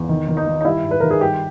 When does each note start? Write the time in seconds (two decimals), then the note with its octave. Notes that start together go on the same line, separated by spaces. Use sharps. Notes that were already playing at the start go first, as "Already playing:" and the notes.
Already playing: E2
0.09 D#3
0.28 D#3
0.37 D#4
0.47 D#3
0.61 D#4
0.65 G3 E4
0.84 G#2
0.91 B4
1.00 D#3 A#4
1.11 G#4
1.21 G3 G4